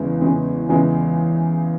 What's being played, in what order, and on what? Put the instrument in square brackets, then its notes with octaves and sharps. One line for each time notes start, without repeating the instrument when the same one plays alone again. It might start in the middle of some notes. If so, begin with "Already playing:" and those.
Already playing: [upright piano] E2 C#3 E3 G#3 B3
E2 C#3 E3 G#3 B3
E2 C#3 E3 G#3 B3